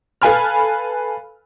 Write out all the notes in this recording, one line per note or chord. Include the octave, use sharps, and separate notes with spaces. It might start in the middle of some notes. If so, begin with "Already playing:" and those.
A4 B4 F5 G#5 B5 F6